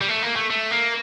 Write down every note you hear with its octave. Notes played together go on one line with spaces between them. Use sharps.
G3
A3
A#3
A3
A3
A#3